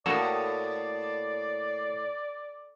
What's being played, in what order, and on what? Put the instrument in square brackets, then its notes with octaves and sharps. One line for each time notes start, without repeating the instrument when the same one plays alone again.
[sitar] F#2 A2 [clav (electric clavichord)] A#3 F#4 A4 [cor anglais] D5